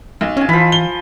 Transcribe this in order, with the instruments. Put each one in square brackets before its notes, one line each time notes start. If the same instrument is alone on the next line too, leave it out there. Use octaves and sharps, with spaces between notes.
[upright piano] B1
[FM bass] C#4 [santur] F5 G#5
[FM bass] E3 [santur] F3 B5
[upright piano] G7